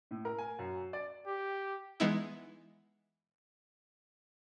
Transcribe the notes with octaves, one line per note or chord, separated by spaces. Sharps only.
A2
A#4
G#5
F#2
D5
G4
E3 G#3 B3 D#4 E4